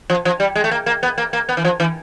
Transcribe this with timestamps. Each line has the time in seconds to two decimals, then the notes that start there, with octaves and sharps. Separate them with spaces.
0.10 F3
0.25 F3
0.40 G3
0.55 G#3
0.64 A3
0.71 A#3
0.86 A#3
1.03 B3
1.18 A#3
1.33 A#3
1.49 B3
1.57 E3
1.65 F3
1.80 E3